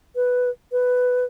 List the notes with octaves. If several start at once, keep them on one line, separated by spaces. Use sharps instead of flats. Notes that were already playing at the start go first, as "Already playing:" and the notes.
B4
B4